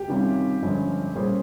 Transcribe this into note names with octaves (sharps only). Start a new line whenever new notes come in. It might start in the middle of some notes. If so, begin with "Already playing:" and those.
Already playing: G4
C3 D#3 G3 C#4 F4
G1 G2 F3 G#3 C#4
A#2 G3 C#4 G#4 C5